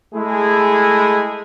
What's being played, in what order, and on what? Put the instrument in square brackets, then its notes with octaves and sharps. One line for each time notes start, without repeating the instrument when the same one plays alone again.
[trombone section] G#3 A3 E4 G#4